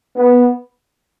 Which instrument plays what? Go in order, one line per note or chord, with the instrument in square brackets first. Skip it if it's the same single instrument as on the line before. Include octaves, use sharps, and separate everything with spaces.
[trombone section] B3